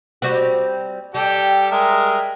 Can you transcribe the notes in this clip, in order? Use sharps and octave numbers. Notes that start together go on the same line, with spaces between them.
G3 C4 F#4
G3 G4 A4 G5
G#3 A#4 E5